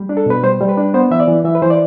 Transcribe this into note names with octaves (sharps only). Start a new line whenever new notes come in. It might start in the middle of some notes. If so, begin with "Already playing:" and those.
Already playing: G3
D4
A4
B2 B4
G3 C5
G3
B4
D4
B3 C5
E3 E5
D5
E3
E3 E5
B4
E3 C5
D5